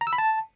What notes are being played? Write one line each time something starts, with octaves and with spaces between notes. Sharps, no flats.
A#5
E6
B5
A5